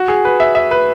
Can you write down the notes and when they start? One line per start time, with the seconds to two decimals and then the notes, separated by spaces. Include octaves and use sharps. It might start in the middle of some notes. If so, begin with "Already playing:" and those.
Already playing: F#4
0.08 G#4
0.25 B4
0.40 E5
0.55 E5
0.71 B4